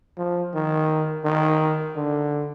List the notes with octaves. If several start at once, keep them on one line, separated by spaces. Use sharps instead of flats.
F3
D#3
D#3
D3